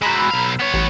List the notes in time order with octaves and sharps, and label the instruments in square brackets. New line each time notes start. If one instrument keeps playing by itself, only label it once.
[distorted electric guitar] G#3 F#4 [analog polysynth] A#5 B5 E6
[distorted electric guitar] B1 F5
B3 C#5
[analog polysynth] A1